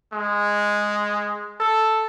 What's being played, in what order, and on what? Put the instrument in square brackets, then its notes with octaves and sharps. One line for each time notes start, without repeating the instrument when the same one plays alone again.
[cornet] G#3
A4